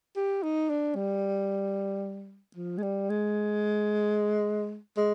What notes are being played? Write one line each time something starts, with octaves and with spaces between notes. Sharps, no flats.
G4
D#4
D4
G3
F3
G#3
G3
G#3
G#3